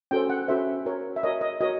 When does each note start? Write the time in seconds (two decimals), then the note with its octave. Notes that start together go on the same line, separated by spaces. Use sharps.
0.11 C#4 F#4 A4 C5 G5
0.30 F#5
0.48 C#4 F#4 A4 C5 E5
0.85 F#4 A#4 C#5
1.16 E5
1.23 F#4 A#4 C#5 D#5
1.41 D#5
1.61 F#4 A#4 C#5 D#5